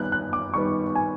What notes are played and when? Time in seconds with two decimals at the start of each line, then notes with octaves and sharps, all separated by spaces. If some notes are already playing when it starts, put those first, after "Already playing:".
Already playing: D#3 G3 B3 F#6
0.12 F#6
0.33 D6
0.54 D#3 G3 B3 C#6
0.95 G#5